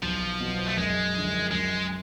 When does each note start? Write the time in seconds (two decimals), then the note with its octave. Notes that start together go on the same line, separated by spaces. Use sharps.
0.02 B1 F3
0.40 B2 F#3
0.66 A3
0.77 F#2 G#3
1.14 D3 F3
1.51 F#2 G#3